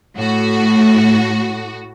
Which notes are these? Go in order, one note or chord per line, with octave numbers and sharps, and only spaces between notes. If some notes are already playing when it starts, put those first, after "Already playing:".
A2 F#4